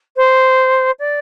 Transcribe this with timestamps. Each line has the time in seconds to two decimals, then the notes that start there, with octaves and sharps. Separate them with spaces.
0.16 C5
0.99 D5